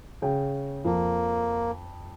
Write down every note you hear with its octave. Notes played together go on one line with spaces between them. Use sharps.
C#3 G5
F2 A#3